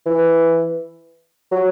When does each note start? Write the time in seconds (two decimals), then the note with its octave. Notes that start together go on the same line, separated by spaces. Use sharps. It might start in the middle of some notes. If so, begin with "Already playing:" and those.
0.06 E3
1.52 F#3